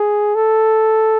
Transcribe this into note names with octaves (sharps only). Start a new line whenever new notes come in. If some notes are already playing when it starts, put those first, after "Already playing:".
Already playing: G#4
A4